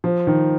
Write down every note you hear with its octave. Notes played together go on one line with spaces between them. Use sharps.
F3
D#3